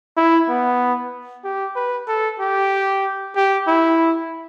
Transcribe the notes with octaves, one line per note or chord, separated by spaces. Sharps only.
E4
B3
G4
B4
A4
G4
G4
E4